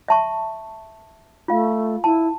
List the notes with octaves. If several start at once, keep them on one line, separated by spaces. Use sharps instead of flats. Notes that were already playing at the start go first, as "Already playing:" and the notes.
E5 A5 C#6
A3 F4 F5
E4 A5